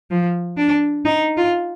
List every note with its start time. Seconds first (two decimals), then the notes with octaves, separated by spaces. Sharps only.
0.11 F3
0.57 D4
1.05 D#4
1.37 F4